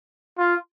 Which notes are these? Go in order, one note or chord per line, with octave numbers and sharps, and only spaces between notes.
F4